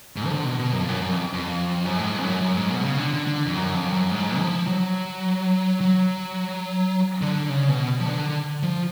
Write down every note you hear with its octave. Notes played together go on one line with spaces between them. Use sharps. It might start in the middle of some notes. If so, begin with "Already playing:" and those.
G#2
F3
D3
B2
B2
F#2
F2
F#2
F#2
F2
F2
F#2
A2
G#2
F2
F#2
F#2
G#2
B2
C#3
D3
D3
D3
F2
F#2
F2
F#2
G#2
F3
F#3
F#3
D3
C#3
B2
F3
D3
F3